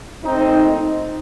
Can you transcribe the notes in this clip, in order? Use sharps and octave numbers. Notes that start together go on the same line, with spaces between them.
A#2 A3 C4 D#4